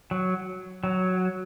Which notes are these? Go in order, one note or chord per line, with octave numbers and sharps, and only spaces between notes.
F#3
F#3